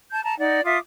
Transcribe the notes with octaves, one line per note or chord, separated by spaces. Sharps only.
A5 G6
A5 A#5
D#4 D5 F#5
F4 E5 D6 D#6